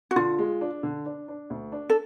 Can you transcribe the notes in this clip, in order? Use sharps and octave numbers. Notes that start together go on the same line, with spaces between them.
F#4
D3 F4
G#3
D4
D3
D4
D4
D2
D4
A4